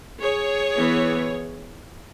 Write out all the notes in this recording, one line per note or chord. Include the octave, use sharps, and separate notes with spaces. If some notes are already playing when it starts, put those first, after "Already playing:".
G#4 C#5
E3 B3